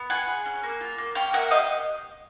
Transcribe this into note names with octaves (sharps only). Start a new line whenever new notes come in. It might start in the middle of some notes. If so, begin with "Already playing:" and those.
Already playing: B3
F4 F#5 G#5
G#4
C#4
A#3
F4
A#3
C#4 F5 G5
A#3 E5 F#5
G4 D#5 F5